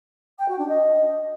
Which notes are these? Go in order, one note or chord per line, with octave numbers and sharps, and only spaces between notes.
G5
F#4
D4
D#5